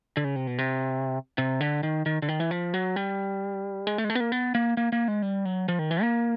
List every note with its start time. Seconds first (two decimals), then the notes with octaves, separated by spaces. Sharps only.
0.17 D3
0.24 C#3
0.36 C3
0.47 B2
0.58 C3
1.38 C3
1.60 D3
1.83 D#3
2.06 D#3
2.22 D3
2.28 D#3
2.40 E3
2.51 F3
2.74 F#3
2.96 G3
3.87 G#3
3.98 A3
4.04 G#3
4.10 A3
4.15 B3
4.20 A#3
4.32 B3
4.55 A#3
4.77 A#3
4.92 A#3
5.08 G#3
5.22 G3
5.45 F#3
5.68 F3
5.79 D#3
5.91 E3
6.02 A#3